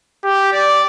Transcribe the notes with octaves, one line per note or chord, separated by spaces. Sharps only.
G4
D5